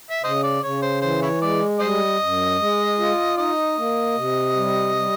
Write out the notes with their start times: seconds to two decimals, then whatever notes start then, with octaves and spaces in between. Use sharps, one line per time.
0.10 E5
0.23 C#3 C5 D#5
0.43 D5
0.63 C#3 C#5
0.82 C5
1.01 E3 C5
1.22 E4 C#5
1.41 G#3 D5
1.80 G3 C5 D#5
2.20 F#2
2.59 G#3
2.98 F4
3.37 D#4 D#5
3.77 A#3
4.16 C3
4.56 G3
4.95 G3